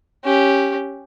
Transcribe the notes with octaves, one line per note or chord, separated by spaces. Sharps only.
C#4 G4